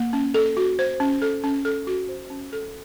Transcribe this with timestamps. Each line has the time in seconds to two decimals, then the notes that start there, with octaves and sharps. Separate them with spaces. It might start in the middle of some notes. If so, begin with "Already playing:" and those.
Already playing: A#3
0.13 C#4
0.34 A4
0.57 F#4
0.79 C5
1.00 C#4
1.22 A4
1.44 C#4
1.65 A4
1.87 F#4
2.09 C5
2.30 C#4
2.53 A4